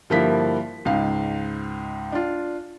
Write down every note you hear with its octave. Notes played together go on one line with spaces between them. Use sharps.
G2 D3 F3 A#3 E4 B6
C#2 G#2 F5
D4 F4